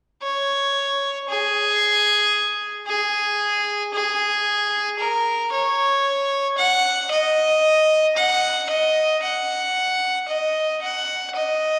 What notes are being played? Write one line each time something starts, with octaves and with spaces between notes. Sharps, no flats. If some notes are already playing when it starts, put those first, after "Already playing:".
C#5
G#4
G#4
G#4
A#4
C#5
F#5
D#5
F#5
D#5
F#5
D#5
F#5
D#5